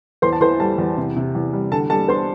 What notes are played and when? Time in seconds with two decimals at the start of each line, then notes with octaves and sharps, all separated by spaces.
0.22 E2 C5 C6
0.33 A5
0.41 E3 C5 C6
0.59 G3 A4 A5
0.78 E2
0.97 C3
1.16 C3
1.35 E2
1.53 G3
1.72 D3 A4 A5
1.90 G3 A4 A5
2.08 D4 C5 C6